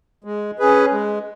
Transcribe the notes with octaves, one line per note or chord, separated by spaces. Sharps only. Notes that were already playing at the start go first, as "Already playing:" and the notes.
G#3
C#4 G#4 B4
G#3